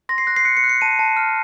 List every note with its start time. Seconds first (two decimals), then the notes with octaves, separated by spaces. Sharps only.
0.09 C6 A#6
0.18 C7
0.27 F#6 A#6
0.36 C7
0.45 F#6 C#7
0.57 C#7
0.64 F#6
0.69 C#7
0.81 A5 D#7
0.99 A5
1.17 F6